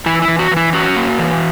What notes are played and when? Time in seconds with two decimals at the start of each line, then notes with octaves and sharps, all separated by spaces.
0.06 E3 E4
0.22 E4
0.28 E3
0.39 F#4
0.51 E3
0.57 E4
0.73 C#4 F#4
0.96 A#3
1.18 E3